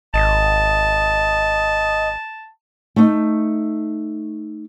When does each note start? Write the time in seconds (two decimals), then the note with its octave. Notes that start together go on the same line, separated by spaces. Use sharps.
0.14 G#1 D#5 A5
2.96 A3 D#4